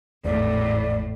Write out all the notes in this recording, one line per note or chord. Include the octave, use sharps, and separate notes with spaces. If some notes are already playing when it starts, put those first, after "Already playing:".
G#1 E2 A2 D5